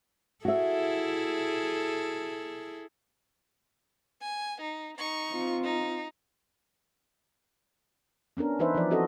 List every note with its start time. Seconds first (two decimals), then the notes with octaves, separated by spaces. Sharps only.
0.45 E4 F#4 G#4 A4 E5
4.22 G#5
4.61 D#4
4.97 D#4 C#6
5.31 C4 F4
5.64 D#4
8.37 B3 C#4 D4 A#4
8.59 E3 D#4 B4 C5 E5
8.74 E3 F3 D5
8.90 F3 C4 F#4 A4 D#5